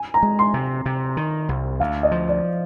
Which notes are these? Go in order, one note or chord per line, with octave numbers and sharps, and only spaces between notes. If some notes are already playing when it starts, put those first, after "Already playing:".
Already playing: G#5
A#5
G#3
C6
C3
C3
D#3
C2
D2 F5
D#5
F3
D5